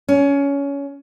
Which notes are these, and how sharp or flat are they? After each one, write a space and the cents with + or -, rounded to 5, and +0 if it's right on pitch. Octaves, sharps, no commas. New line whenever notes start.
C#4 +20